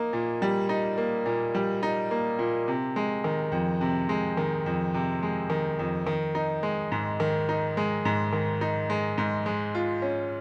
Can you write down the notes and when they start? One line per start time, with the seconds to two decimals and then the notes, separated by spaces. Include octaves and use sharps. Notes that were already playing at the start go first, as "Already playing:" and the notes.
Already playing: A#3 D#4
0.13 A#2
0.42 G3
0.69 D#4
0.98 A#3
1.26 A#2
1.55 G3
1.83 D#4
2.11 A#3
2.39 A#2
2.68 C3
2.96 G#3
3.24 D#3
3.52 F2
3.81 C3
4.09 G#3
4.37 D#3
4.66 F2
4.94 C3
5.23 G#3
5.50 D#3
5.79 F2
6.07 D#3
6.35 D#4
6.63 G#3
6.92 G#2
7.20 D#3
7.49 D#4
7.77 G#3
8.05 G#2
8.33 D#3
8.61 D#4
8.90 G#3
9.18 G#2
9.46 G#3
9.75 F4
10.02 C#4